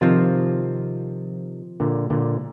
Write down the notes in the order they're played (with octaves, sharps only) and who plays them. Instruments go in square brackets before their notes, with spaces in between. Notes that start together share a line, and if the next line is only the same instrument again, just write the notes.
[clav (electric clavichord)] C3 D#3 [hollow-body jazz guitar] F3 C4 F4
[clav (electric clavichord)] A#2 D3
A#2 D3